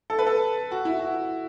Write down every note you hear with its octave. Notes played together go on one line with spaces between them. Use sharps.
A4
B4
A4
F#4
E4
F#4